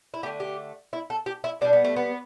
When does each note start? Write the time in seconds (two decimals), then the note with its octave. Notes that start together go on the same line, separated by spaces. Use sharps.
0.14 E4
0.23 A3 G4
0.26 D3
0.40 G4
0.93 E4
1.10 A4
1.26 G4
1.44 E4
1.61 B2 G3 D4
1.73 B3
1.85 A3
1.96 B3